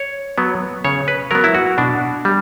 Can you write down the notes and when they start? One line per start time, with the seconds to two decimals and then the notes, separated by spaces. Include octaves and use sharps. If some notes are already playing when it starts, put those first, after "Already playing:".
Already playing: C#5
0.38 F#3 B3
0.85 C#3 C#5
1.08 B4
1.31 F#3 B3 A#4
1.44 E4
1.54 F#4
1.78 B2 D4
2.25 G3